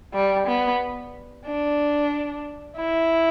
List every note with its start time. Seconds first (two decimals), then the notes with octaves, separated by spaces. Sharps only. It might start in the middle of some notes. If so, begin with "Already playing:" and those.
0.14 G3
0.47 B3
1.46 D4
2.77 E4